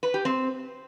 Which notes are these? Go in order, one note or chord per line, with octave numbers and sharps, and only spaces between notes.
B4
G4
C4